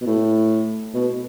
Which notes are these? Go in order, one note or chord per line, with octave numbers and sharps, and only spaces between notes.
B2
A2
B2